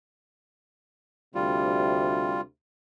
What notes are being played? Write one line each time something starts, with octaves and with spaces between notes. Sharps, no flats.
D2 C3 G3 F4